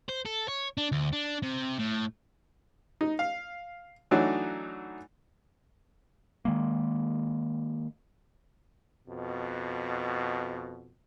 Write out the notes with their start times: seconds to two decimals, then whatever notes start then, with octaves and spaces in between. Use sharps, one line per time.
0.09 C5
0.26 A4
0.48 C#5
0.78 D4
0.92 D2
1.12 D4
1.43 C3
1.79 A2
3.01 D#4
3.19 F5
4.11 E3 F#3 A3 D4 D#4 F#4
6.45 D#3 G#3 A#3
9.08 F2 B2